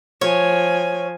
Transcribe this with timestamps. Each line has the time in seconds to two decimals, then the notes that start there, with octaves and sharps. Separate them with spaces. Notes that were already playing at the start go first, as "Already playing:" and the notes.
0.21 F3 C#5 G#5